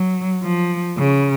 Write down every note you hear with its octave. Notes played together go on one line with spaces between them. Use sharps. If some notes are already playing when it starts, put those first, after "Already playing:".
Already playing: F#3
F3
C#3